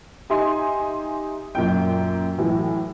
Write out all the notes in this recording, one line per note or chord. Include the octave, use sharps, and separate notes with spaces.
D#4 G4 E5 G#5 C6
F#2 A#2 G5
A2 E3 F#3